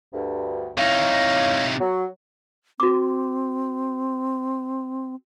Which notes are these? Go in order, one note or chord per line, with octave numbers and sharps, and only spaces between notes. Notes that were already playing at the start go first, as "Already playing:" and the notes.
D2 G2
C3 D#4 E4 C#5 F5
F#3
C4 F#4 D6